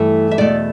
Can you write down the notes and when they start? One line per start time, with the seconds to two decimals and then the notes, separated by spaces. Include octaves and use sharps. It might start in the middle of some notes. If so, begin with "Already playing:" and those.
Already playing: G2 E3 A3
0.31 E5
0.38 E2 B2 A3 D5